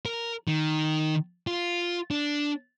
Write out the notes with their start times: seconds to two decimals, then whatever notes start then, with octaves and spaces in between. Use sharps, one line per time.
0.06 A#4
0.48 D#3
1.47 F4
2.11 D4